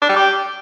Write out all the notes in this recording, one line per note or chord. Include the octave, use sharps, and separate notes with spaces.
D4
G3
G4